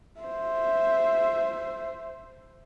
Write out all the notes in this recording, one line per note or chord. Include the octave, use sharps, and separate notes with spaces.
C5 E5